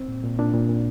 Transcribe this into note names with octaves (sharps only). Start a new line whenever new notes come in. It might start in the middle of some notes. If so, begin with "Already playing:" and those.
Already playing: C4
A#2
A#2
A#2 D4
A#2
A#2